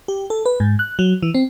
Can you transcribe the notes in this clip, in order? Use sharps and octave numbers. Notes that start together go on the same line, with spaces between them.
G4
A4
B4
G#2
F#6
F#3
E3
C4